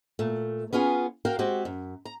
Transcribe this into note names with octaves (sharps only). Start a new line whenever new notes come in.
A#2 A3
B3 C#4 F4 G#4 G#5
F#4 A#4 F5 G5
G#3 C4 F#4 G4
F#2
A#5